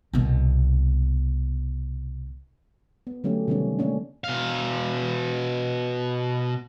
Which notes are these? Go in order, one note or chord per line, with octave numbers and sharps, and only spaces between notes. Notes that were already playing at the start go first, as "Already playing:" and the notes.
C2 B2
B3
D3 F#3 A3 C#4 G4
C3 D#3 G3 B3 C#4
A3 A#3 C#4 D4
B2 F5